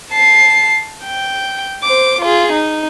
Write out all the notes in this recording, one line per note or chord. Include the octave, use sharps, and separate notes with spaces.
A5 C7
G5
C5 D6
F4 G#4
D#4